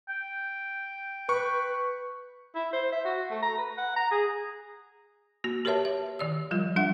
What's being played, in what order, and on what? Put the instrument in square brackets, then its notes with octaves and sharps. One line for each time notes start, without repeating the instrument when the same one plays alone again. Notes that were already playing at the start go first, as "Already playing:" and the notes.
[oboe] G5
[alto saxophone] B4 [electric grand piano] C#6
[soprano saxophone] E4
C5
E5
F#4
A3
A#5
B4
F#5
A#5
G#4
[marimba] A#3 F#4
G4 A#4 B4 C#5 E5 A5
E5
D#3 D5 E6
F3 G3 F4
F#3 D4 E5 F#5